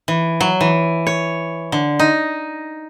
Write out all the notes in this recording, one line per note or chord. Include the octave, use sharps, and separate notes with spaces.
E3
F#3
E3
C#5
D3
D#4